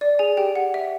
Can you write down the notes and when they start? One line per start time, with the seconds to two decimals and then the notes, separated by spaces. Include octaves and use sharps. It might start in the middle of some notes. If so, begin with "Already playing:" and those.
0.01 D5
0.19 G#4 G#5
0.37 G4 G5
0.55 F#5
0.74 E5